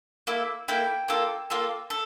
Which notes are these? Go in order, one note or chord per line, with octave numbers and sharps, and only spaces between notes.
A#3 E4 A4
A#3 E4 A4 G5
A#3 F4 A4
A#3 F4 A4
A4